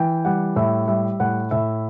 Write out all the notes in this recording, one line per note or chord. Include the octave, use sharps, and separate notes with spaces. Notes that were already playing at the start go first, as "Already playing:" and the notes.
Already playing: E3 G5
G3 F#5
A2 E5
G3 E5
A2 F#5
A2 E5